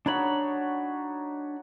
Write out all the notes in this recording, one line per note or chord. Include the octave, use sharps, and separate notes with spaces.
D4 D#4 F#4 C#5 B5